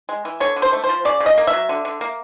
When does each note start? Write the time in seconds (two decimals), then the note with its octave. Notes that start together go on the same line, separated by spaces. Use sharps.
0.09 G#3
0.25 E3
0.40 D3 C#5
0.56 D3
0.62 C5
0.73 A3
0.84 C5
0.89 F3
1.05 C#3 D5
1.20 C#3
1.26 D#5
1.38 A#3
1.47 E5
1.53 F#3
1.69 D3
1.85 D3
2.01 A#3